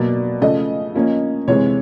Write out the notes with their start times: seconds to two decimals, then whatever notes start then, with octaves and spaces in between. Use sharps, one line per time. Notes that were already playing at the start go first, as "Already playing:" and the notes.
Already playing: B2 F#3 A#3 D5
0.42 C#3 F3 A3 D#5
0.95 F3 A#3 C#4
1.48 C3 E3 G#3 C4 C#5